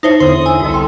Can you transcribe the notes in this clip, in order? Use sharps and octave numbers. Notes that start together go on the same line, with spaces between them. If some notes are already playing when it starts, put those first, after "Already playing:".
D#4 E4 C5 C#5 E5 A5
E2 D3 C5 C6 D#6
G#5 E6
C2 F4 F#4 A4 D#5
B4 G5 C6